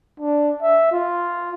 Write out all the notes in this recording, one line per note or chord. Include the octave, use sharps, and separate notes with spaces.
D4
E5
F4